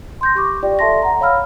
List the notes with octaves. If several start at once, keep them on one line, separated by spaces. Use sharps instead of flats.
C6 G6 A#6
G4 C#6 D6
F4 G4 D5 G5
A4 D5 E5 A5 C6 A#6
F#5 A#5
C#5 F5 B5 E6 F6